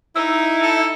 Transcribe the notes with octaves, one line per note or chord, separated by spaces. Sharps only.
D#4 E4 E6
A4